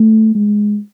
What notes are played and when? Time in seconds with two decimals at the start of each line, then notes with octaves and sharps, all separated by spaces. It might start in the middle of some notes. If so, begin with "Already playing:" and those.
Already playing: A3
0.35 G#3